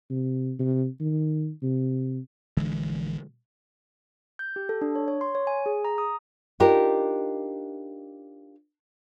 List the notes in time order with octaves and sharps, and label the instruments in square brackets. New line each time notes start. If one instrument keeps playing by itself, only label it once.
[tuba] C3
C3
D#3
C3
[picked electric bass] A#1 D3 E3 G#3
[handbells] G6
G4
A4
D4
C#5
C#5
C6
C#5
G#5
G#4
A#5
D#6
[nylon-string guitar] D4 D#4 F4 G4 A#4